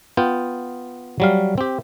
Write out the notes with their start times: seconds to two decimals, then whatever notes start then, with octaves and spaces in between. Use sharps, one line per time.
0.17 B3 F4 G5
1.20 F#3 G3 F5
1.58 C4 G4